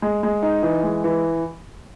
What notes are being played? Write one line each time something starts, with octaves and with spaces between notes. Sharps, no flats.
G#3
G#3
D#4
E3
G#3
E3